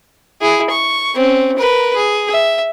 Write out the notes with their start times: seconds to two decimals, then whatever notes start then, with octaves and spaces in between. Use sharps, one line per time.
0.41 E4 G#4
0.71 C#6
1.15 C4 C#4
1.58 A#4 B4
1.96 G#4
2.31 E5